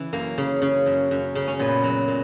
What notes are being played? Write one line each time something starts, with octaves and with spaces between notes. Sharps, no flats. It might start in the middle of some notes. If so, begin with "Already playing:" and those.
Already playing: C#3 E3
F#2 A#3
C#3
C#3
F#2
F#2
C#3
C#4
A#2 B3
F#3
A#2